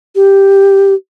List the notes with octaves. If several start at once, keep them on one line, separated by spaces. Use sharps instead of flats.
G4